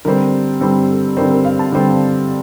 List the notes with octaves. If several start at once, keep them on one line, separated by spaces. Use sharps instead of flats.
D3 G3 C4 A#4
D3 G3 C4 A4
A4
D3 G3 C4 A#4
A#4
F5
A5
D3 G3 C4